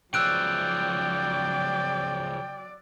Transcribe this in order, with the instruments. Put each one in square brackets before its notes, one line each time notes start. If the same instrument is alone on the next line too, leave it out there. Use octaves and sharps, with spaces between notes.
[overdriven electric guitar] C#3 F3 [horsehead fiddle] F#3 D5 [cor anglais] G5 [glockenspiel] E6 F#6 D7